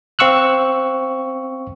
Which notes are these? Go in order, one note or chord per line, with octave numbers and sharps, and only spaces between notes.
C4 F5 C#6 E6 F#6